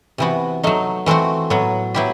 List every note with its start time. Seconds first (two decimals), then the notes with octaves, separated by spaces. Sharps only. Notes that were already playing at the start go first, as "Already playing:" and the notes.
0.18 C3 E3 B3 F#4
0.63 F#3 A3 D#4
1.06 E3 A3 C4 F#4
1.50 A2 F#3 B3
1.94 F#3 B3 E4 G4